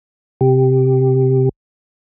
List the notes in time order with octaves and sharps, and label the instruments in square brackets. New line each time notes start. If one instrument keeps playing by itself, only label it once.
[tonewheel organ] C3 G4